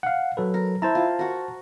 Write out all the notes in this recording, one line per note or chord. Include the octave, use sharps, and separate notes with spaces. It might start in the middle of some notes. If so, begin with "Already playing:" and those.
F5 F#5
F#3 A4 B4
A#4
E4 C5 A5 A#5
F4
F#4 A#4